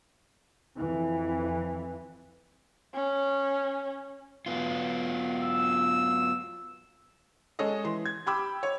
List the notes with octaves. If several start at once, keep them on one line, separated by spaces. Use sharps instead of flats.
F2 E3
C#4
F#3 B3 F4
E6
G#3 C#4 A4 D#5
E3 C6
G#6
G4 G5 B5 D6 E6
C#5